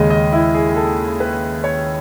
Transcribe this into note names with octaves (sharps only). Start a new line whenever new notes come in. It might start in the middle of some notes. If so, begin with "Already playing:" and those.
Already playing: D#2 C#3 G#3 D#5
D#5
E4
G#4
A4
B4
C#5